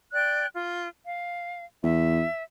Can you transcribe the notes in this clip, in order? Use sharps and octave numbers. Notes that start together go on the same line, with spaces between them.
D5 G5 F#6
F4
F5
E2 E5